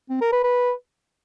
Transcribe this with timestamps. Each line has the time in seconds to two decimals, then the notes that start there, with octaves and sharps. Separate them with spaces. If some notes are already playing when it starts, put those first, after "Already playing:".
0.10 C4
0.21 A#4
0.32 B4
0.44 B4